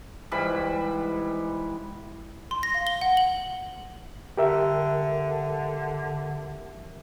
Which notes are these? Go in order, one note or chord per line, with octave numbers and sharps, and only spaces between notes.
G#2 E3 G3 B5
C6
A#6
F5
G7
F#5
F#7
D3 G4 A#4 E5